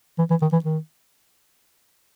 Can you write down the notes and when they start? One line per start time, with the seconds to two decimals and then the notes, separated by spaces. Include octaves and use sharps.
0.19 E3
0.31 E3
0.42 D#3
0.53 E3
0.64 D#3